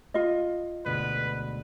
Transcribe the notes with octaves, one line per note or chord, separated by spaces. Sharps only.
F4 D#5
D2 G#2 B2 B4